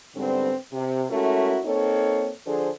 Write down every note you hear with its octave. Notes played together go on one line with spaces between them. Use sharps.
G#2 D3 G3 B3 C4
C3
G#3 A3 C#4 E4 F#4 A#4
A#3 C4 D#4 A4 C#5
D3 F3 D4 G#4 A4 C5